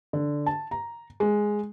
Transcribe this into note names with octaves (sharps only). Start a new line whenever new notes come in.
D3
A5
A#5
G#3